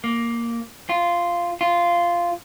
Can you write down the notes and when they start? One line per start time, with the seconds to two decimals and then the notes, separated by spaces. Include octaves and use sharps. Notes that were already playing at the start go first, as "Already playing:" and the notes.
0.04 A#3
0.89 F4
1.61 F4